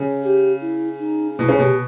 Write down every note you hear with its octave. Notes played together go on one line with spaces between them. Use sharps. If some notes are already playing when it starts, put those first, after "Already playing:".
Already playing: C#3
G4
E4
D#4
B2 E4
C#3
B2 G4